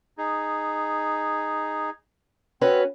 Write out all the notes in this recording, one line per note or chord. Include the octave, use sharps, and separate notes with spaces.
D#4 G#4
C4 C#4 F#4 B4